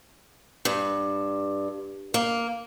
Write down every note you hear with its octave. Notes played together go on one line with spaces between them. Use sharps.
G2
A#3